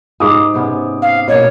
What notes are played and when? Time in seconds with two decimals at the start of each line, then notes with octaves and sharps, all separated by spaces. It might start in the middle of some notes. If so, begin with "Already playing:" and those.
0.20 G#2 F5 D6 D#6
0.54 C3 B3 C#4
1.02 F5
1.28 B2 A#3 C#5